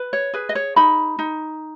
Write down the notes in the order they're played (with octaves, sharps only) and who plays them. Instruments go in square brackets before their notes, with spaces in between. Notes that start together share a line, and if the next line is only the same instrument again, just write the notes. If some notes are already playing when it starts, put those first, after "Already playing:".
Already playing: [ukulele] B4
C#5
G#4 B4
D#5
C#5
D#4 B5
D#4